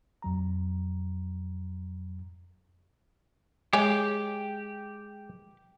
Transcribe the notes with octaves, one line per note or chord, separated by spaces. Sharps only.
F2 F#3 A#5
G#3 G4 G#4 C#5 G#5